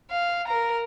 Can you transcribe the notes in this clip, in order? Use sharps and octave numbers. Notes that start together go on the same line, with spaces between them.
F5
A#4 A#5